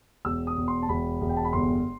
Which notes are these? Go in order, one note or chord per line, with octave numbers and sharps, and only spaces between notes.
E1 E6
D#6
E1
C6
A5
E1 B5
E1
G5
A5
B5
G1 C6